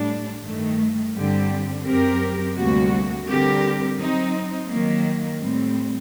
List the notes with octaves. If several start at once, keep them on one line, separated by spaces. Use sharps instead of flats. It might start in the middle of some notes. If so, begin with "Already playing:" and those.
Already playing: A2 G3 D4
G2 D#3 A3
G2 D3 G3 C4 G4
F#2 F#3 C4 G4 A#4
D2 C3 G3 A#3 F#4
D3 G3 C4 G4 A#4
F#3 C4 D#4
D#3 F#3 A#3
A2 G3 C4